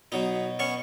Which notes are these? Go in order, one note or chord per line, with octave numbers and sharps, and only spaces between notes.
B2 F#3 D#4
B3 C#4 C#6